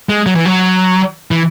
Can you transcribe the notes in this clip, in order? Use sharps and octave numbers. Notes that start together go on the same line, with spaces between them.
G#3
F#3
E3
F#3
E3